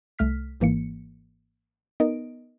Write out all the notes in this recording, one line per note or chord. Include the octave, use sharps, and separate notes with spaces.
C2 A3 F6 B6
G#1 G#2 E3 A#3 C#7
B3 D#4 A#4 D#5 D7